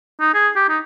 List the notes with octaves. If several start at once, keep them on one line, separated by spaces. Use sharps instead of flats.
D#4
G#4
G4
D#4